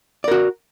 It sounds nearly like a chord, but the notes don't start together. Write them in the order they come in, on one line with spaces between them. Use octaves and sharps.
D5 A#4 F#4